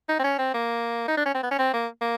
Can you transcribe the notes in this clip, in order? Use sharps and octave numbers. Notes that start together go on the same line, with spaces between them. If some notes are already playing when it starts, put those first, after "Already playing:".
D#4
C4
C#4
C4
A#3
D#4
D4
C#4
C4
B3
C#4
C4
A#3
A#3